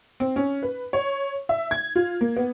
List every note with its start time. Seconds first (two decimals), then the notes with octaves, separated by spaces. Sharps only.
0.20 C4
0.36 C#4
0.63 B4
0.93 C#5
1.49 E5
1.71 G#6
1.96 F4
2.21 A#3
2.37 B3